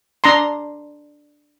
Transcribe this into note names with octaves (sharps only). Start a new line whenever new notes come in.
D4 A#5 C6